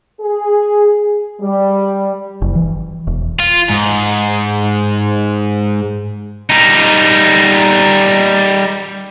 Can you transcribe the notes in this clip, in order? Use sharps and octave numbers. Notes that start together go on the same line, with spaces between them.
G#4
G3
F#1
E3
E1
F4
G#2
G3 D#4